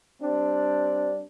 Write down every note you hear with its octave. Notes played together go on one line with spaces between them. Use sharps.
G3 C4 D4